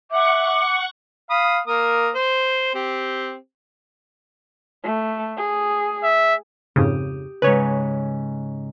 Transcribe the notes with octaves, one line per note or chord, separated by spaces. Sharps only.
E5 F#5 C#6 D6
F5 B5 D#6
A#3 A#4 D#6
C5
C4 G4
A3
G#4
E5
F2 G#2 C#3 G4 D#6
G#2 C#3 B4 C#5